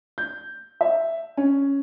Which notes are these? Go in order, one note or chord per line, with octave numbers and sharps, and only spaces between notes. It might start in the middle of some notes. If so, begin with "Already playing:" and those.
G6
E5
C#4